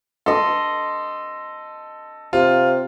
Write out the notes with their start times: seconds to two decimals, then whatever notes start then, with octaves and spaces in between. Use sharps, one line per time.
0.26 A4 D#5 C6
2.33 C3 F4